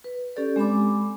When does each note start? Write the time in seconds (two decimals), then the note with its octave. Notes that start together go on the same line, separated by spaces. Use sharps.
0.04 B4
0.36 C#4 G4 A4 D5
0.56 G#3 C4 G#5 B5 D6